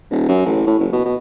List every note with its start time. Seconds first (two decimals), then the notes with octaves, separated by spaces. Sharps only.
0.11 D#1
0.28 F#2
0.46 A1
0.67 A2
0.79 F#1
0.93 B2
1.05 B2